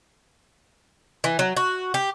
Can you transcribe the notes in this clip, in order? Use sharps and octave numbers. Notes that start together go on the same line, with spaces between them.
E3
F#3
F#4
G4